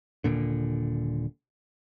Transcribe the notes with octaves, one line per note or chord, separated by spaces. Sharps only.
D#1 A#2 D3